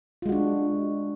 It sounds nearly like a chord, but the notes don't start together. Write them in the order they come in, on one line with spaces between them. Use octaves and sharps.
F4 G#3 F#4 D4